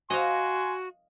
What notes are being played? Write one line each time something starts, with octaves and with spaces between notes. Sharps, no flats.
F#4 D#5 F5 G#5 C6